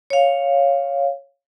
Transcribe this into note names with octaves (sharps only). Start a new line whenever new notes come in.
C#5 F5